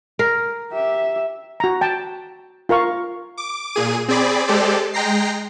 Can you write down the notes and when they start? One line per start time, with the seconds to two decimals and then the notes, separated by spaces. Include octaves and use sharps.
0.19 A#4
0.72 G4 E5
1.60 F#4 A#5
1.81 G5 A5
2.69 F4 A#4 F5 C#6
3.38 D6
3.74 A#2 G#4 D#7
4.08 C4 G#4 D5 B5
4.48 G#3 G4 A4 C5 D5
4.94 G#3 G5 A#5 A#6 C7